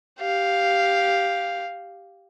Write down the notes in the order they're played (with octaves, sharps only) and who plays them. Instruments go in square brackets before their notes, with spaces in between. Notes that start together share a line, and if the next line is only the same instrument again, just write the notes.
[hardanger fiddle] G4 F5